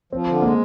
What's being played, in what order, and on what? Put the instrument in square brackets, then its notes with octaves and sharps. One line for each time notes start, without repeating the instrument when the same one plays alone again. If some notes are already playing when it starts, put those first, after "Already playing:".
[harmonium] F3 [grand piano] C4
[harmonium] D3
[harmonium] G#3 [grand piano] A#3